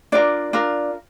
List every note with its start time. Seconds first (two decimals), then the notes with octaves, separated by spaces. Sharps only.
0.12 D4 F4 A#4 D5
0.53 D4 F4 A#4